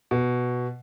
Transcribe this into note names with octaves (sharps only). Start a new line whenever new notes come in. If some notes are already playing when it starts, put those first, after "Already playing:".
B2